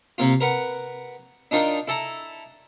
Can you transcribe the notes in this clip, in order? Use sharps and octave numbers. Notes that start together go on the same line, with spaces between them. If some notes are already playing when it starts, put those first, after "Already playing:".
C3 A#3 F4
A#4 B4 F#5
D4 D#4 F4 A#4 G5
E4 A4 A5 A#5